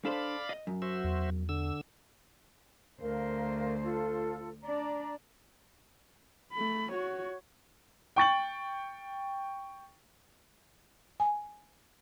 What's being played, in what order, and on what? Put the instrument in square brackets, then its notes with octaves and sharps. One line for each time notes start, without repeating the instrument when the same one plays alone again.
[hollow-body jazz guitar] D4 A4 C5 [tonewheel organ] D5 F5 B5
[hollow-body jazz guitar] D#5
F#2
[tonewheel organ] F#4 C5 E5
[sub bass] E2
[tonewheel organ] D3 E6
[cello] D2 C5 [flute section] A#4 F5
[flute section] F4 A4
[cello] D4 D5 [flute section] A#5
[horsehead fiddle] A3 B5
F#4 C#5
[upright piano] G5 C#6 A6 F#7
[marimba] G#5